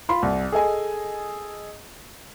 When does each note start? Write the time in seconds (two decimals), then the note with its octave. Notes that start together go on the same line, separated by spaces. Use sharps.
0.09 F4 B5 C6
0.23 C2
0.52 G#4 A4 D#5 G#5